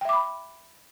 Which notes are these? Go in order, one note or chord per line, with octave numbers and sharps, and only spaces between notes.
E5 G5 B5 D6